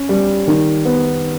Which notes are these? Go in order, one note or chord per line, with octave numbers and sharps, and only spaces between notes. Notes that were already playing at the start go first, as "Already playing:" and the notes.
Already playing: C#4
G3
D#3
B3